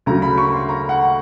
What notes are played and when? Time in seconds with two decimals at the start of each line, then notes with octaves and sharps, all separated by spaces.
0.06 D2 C#3 F#3 A#5
0.22 B5
0.38 C#6
0.53 C6
0.69 A#5
0.89 F#5